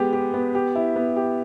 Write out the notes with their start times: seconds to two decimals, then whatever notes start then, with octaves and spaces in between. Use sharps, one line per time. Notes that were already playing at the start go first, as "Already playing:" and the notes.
Already playing: G#3 B3 G4
0.13 G4
0.34 B3
0.55 G4
0.76 E4
0.96 B3
1.17 G4